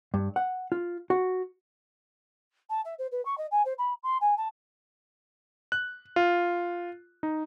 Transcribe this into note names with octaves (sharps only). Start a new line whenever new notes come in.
G2
F#5
F4
F#4
A5
E5
C5
B4
C#6
D#5
G#5
C5
B5
C6
G#5
A5
F#6
F4
D#4